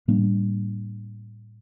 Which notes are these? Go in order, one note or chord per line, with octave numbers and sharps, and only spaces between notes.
A2 G3 A#3 D4